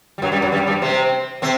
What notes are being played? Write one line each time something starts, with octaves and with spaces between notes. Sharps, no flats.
G3
F#2 F#3
G2 G3
F#2 F#3
G2 G3
G2 G3
C3 C4
C3 C4